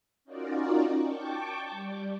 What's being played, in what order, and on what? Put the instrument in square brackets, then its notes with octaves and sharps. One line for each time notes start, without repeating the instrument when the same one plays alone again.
[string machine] C#4 D#4 F4 F#4 A#4 D5
G5 A5 C#6 D6
G3